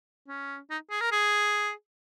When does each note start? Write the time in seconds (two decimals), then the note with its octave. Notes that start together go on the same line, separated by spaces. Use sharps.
0.28 C#4
0.70 D#4
0.90 G#4
1.01 A#4
1.12 G#4